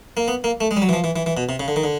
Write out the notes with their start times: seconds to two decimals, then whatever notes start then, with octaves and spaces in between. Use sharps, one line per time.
0.17 A#3
0.28 B3
0.44 A#3
0.61 A3
0.71 G#3
0.77 G3
0.82 F#3
0.89 E3
0.93 F3
1.04 E3
1.16 E3
1.26 E3
1.37 B2
1.49 C3
1.60 C#3
1.68 D3
1.76 D#3
1.84 D3